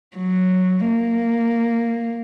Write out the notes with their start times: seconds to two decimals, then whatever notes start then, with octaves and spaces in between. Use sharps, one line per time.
0.18 F#3
0.88 A#3